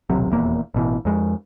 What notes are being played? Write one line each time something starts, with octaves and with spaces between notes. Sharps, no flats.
D#1 B1 C3 F#3
D#1 E2 A#3
A1 B2 E3
F2 G#3